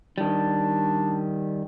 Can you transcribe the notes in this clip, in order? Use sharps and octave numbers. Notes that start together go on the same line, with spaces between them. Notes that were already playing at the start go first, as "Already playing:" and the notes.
D#3 G3 D4